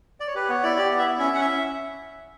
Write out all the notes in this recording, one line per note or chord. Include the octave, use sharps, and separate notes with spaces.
D5
C#5
G4 B4
B3 C#5
E4 D5
G4 D5
B3
E5
E4
C#4 E5
C#4 F#5
E5